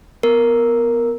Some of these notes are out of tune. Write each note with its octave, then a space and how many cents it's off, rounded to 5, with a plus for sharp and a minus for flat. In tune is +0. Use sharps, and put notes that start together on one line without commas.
B3 +0 A#4 +0